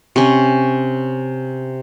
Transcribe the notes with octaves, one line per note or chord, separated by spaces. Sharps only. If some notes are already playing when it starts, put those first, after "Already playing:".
C3 C#4